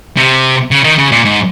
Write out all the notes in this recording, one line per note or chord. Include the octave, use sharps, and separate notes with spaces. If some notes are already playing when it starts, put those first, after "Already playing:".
C3
C#3
D#3
C#3
A#2
G#2